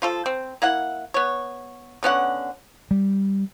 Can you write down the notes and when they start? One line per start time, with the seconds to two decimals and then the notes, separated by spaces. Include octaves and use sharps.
0.02 F3 F4 A4
0.26 C4
0.62 A#3 E4 F#5
1.14 B3 C#5
2.03 D3 B3 C#4 F#5
2.91 G3